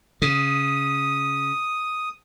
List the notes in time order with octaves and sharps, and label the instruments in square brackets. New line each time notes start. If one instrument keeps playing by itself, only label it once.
[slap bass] C#3 [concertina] D#6